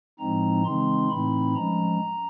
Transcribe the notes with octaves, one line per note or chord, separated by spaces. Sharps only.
A2 F3 G#3 C4 D#4 A#5
C#3 E3 G#3 C4 D#4 C6
A2 E3 A3 C4 D#4 B5
F3 G#3 C#4 A#5